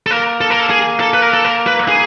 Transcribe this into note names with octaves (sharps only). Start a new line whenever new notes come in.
A4
A#3 A#4
A4
A#4
A4
G#4
A4
B4
A#4
A4
A#4
B4
G#4